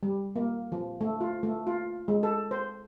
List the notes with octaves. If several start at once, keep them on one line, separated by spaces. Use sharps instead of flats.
G3
A#3
F3
A3
F4
A3
F4
G#3
A4
C5